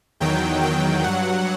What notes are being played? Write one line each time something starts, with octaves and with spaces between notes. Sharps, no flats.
E2 D#3 F#3 G5
E2 D#3 F#3 G5
G2 F#3 F#5